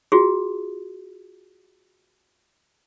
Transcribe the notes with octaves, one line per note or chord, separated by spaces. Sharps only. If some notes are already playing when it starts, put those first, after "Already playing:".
F4 F#4 G#4